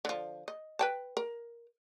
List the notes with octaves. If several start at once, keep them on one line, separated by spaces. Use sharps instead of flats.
D3 F3
D#5
B4 G5 A5
A#4